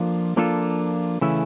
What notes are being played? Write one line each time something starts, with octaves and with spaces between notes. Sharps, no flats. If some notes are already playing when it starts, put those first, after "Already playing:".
Already playing: F3 A#3 D4 F4 A4
F3 A#3 D4 F4 A4
C#3 E3 A3 C#4 E4